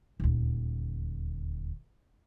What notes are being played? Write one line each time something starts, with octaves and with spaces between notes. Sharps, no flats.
D#1 D2